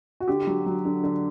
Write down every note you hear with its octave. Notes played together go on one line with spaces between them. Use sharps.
F#4
D3 G4
F#3
F#3
D3
D3